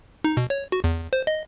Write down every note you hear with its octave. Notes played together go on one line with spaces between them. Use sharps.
D#4
B2
C#5
F#4
E2
C5
D#5